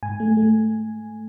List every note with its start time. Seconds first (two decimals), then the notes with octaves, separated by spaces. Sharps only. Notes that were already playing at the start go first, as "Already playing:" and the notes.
0.03 G#2 G#5
0.20 A3
0.37 A3